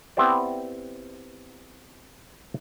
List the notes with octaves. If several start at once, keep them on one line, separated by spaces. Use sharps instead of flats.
B3 C4 E4 G4 C5 D5